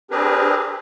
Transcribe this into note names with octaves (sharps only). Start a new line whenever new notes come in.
C4 D4 G4 G#4 A#4 B4